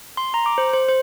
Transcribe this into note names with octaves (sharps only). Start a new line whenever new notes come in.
C6
A#5
D6
C5
C5
C5